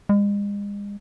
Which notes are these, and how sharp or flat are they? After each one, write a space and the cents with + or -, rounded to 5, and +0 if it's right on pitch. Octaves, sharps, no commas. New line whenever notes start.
G#3 -40